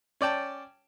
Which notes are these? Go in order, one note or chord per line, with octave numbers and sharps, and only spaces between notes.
C#4 D5 G5 A5